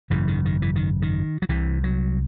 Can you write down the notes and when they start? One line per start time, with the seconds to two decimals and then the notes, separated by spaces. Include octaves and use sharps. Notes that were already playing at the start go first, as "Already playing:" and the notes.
0.10 G#1 F#2 C#3 E3
0.28 D#3
0.45 D#3
0.62 E3
0.76 D#3
1.02 D#3
1.42 F#3
1.49 C2 C3 E3
1.84 F#3